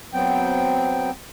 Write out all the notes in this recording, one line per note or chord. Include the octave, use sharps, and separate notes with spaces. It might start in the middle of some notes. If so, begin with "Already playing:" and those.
F#3 B3 C4 G5